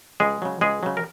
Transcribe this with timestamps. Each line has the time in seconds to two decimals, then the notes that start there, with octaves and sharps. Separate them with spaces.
0.20 C#2 G#3 G#4
0.42 C#3 F#3
0.61 C#2 G#3 G#4
0.83 C#3 F#3
0.97 A#4